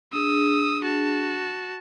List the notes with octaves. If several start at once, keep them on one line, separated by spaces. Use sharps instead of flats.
D4 G#4 D#6 E6
F#4 A5